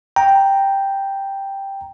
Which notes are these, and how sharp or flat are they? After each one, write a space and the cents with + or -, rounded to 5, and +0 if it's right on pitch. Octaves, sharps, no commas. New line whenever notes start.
G5 +0 A#5 +0